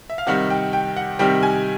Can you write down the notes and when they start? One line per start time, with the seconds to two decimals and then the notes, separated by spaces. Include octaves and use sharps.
0.10 E5
0.18 F5
0.27 C3 D#3 G3 F#5
0.50 G5
0.73 G5
0.96 F#5
1.19 C3 D#3 G3 G5
1.43 G#5